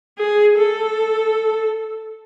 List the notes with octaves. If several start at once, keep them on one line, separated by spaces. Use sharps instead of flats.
G#4
A4